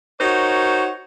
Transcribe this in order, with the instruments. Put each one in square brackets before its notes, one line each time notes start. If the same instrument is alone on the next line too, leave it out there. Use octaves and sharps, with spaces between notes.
[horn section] D#4 F#4 A#4 C5 C#5